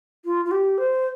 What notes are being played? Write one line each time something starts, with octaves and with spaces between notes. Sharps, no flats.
F4
F4
G4
C5